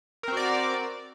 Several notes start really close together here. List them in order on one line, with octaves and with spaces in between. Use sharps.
A#4 C4 F#4 D5